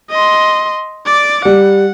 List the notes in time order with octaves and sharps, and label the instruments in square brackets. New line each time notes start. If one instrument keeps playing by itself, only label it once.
[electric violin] D#5 C6
D5 D6
[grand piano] G3 [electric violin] F#5